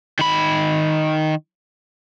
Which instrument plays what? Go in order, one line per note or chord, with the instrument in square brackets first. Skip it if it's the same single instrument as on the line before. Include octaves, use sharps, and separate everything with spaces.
[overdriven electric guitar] D#3 B5